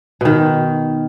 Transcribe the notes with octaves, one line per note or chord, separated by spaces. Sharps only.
B2 D#3